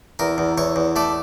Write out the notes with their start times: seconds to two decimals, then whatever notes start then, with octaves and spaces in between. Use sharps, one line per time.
0.19 E2 A#4
0.38 E2
0.58 E2 C#5
0.76 E2
0.96 A3 D5